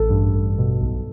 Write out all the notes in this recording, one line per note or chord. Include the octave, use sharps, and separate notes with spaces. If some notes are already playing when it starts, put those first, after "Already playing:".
Already playing: A1 A4
G2
A1
B2
B1